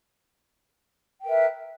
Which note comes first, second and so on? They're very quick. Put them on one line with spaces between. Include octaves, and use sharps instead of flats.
G5 A#4 B4 E5